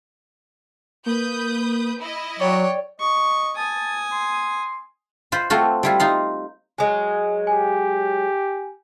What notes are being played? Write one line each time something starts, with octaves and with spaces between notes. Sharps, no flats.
A#3 B4 D#6 G6
E4 D#5
F#3 C#5 D5 G5
D#5 C#6
G#5 A5 D#6
C6
F4 B4 C5
A3 C4 F4 F#4
G3 E4 F4
D#4 F4 F5
F#3 G#3 G#5
G4 G#5